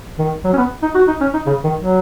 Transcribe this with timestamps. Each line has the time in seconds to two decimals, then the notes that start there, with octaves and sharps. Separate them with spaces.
0.19 D#3
0.44 F#3
0.53 C#4
0.57 B3
0.83 D#4
0.95 F#4
1.08 D#4
1.21 C#4
1.34 D#4
1.46 C#3
1.64 D#3
1.80 F#3